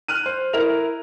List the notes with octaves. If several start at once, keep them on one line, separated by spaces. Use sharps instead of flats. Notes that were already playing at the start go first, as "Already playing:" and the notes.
F6 F#6 D#7
C5
E4 A#4 F7